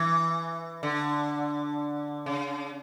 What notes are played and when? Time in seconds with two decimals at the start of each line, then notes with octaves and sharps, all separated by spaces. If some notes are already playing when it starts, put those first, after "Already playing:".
Already playing: E3
0.83 D3
2.26 C#3